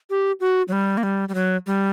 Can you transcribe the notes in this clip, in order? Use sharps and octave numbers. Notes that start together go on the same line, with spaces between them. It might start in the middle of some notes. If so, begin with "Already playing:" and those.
G4
F#4
F#3
G3
A#3
G3
G3
F#3
G3